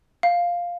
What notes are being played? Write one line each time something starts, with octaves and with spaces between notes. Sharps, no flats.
F5